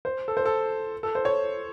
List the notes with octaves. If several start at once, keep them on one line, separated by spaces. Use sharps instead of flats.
C5
A4
C5
A4
A4
C5
C#5